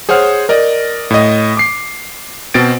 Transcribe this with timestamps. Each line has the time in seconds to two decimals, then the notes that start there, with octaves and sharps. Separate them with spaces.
0.09 G#4 C5 C#5 F#5 F6
0.49 A#4 D5 D#5
1.11 A2 D#5
1.57 D6 C7
2.54 B2 C4 C5 A6 D7